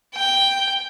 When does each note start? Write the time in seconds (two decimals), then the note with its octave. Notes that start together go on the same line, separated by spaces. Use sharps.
0.15 G5